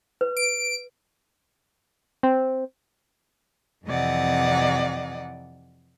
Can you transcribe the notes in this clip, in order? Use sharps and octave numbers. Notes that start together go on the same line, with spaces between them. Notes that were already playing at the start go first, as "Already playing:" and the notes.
B4
D7
C4
F2 C3 E3 D5 D#5 F#5